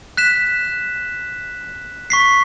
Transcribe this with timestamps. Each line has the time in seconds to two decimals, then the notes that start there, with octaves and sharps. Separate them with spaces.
0.17 F#6 B6 E7
2.10 C#6 B6 C7